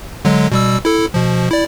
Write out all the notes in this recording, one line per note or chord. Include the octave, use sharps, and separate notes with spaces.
D3 F#3 G#3
B2 G3 E6
E4 A4
B2 F3
E4 D5